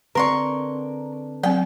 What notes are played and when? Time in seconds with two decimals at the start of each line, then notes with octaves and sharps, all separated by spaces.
0.15 D3 C4 A#4 B4 D5 C6 C#6
1.43 F#3 C4 G5